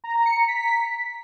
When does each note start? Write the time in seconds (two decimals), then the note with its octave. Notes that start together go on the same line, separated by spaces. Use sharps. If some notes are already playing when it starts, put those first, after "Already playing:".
0.04 A#5
0.15 A#5
0.26 C#7
0.37 A#5
0.48 B6